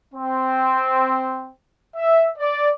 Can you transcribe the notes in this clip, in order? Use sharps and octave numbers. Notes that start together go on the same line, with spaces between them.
C4
E5
D5